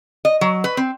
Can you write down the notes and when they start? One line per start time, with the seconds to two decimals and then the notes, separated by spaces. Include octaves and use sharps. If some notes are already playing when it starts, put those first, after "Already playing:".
0.25 D#5
0.41 F#3
0.64 B4
0.77 C4